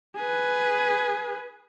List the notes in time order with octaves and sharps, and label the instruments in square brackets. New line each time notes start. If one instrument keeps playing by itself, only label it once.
[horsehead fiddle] G#4 B4